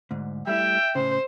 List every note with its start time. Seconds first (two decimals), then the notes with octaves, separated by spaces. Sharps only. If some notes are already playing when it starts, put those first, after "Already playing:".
0.11 D2 G#2
0.47 G3 A3 E4 E5 G5
0.95 A2 C#3 C5